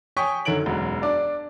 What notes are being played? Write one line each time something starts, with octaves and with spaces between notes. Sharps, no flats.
C#5 G5 G#5 C#6 D#6 B6
F#2 D3 D#3 C#5 D7 F#7
E1 F#2 F#3
D4 D5